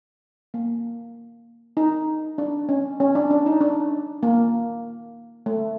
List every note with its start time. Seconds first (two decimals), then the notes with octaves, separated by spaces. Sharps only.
0.54 A#3
1.77 D#4
2.38 D4
2.69 C#4
3.00 C#4
3.15 D4
3.31 D4
3.46 D#4
3.61 D4
4.23 A#3
5.46 A3